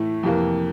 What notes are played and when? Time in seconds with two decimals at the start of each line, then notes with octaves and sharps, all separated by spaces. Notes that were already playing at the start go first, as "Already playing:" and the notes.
Already playing: A2 E3 A3
0.23 F2 C3 E3 A#3